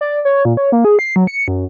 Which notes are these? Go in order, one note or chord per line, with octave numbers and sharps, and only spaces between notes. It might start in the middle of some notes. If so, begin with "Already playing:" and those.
D5
C#5
A#2
C#5
A#3
G#4
C7
F#3
C#7
F#2